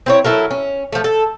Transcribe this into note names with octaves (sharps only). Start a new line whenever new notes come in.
C4 E4 C#5
F#3 E4 A4 A#4
C#4
F3 A3
A4